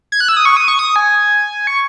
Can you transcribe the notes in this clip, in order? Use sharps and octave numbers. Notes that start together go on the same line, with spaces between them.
G#6
F#6
E6
D#6
C#6
D#6
C#6
D#6
G#5
C#6